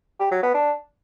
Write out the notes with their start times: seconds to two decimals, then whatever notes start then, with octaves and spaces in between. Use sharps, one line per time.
0.20 G4
0.31 F#3
0.43 B3
0.54 D4